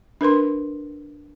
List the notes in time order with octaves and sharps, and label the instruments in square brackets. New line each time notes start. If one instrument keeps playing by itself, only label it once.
[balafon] D4 A#4 B4 C6